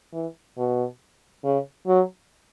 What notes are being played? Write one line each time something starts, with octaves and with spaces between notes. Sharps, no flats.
E3
B2
C#3
F#3